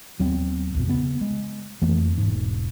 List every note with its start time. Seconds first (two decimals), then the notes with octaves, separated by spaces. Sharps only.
0.19 D#2 F#3 B3 C4
0.75 B1 F2 B2
0.87 C#3 B3
1.21 G#3
1.82 F2 E3 A3 A#3
2.18 E1 G#2